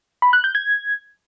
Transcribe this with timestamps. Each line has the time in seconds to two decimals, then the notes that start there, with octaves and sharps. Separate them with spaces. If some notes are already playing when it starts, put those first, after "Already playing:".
0.22 B5
0.33 F#6
0.44 G6
0.55 G#6